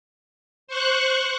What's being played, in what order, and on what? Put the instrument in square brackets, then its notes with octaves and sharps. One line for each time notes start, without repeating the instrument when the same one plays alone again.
[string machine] C5 C#6 F#6